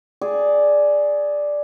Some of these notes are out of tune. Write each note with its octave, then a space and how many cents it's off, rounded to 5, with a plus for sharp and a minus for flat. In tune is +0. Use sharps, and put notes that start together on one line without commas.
G#4 +5 D5 +0